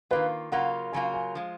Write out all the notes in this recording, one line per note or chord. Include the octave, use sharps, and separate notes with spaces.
D#3 A#3 F4 B4
C#3 F#3 A#3 F4 F#5
C#3 F#3 A#3 F4 G#5
G#5
F3 G#3